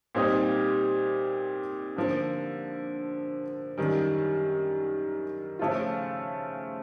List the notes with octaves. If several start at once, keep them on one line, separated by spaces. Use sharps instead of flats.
A#2 G3 C4 D#4 G4
D3 F3 A#3
F#2 D#3 G3
C#3 F3 A3 C#4 F4